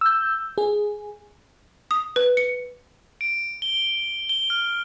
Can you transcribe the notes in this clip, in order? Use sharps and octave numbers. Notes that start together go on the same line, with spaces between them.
E6 G6
G#4
D#6
B4
C#7
D7
G7
G7
F6